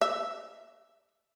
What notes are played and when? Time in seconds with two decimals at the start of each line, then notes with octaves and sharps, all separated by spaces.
0.01 E5